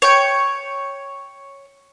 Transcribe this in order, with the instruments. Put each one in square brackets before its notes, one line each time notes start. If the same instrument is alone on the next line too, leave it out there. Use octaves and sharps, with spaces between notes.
[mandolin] C#5 G5